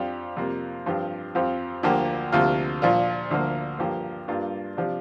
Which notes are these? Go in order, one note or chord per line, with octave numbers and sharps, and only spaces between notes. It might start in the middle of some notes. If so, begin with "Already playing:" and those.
Already playing: F2 F3 D4 G4
F2 C3 A#3 F4
G2 F3 C4 G4
F2 F3 C4 G4
D2 D3 F3 A#3 G4
D2 C3 F3 A#3 F4
A#2 F3 D4 F4
D2 D3 F3 A#3
G2 F3 A#3 G4
G2 G3 A#3 D4 F4
C3 F3 D4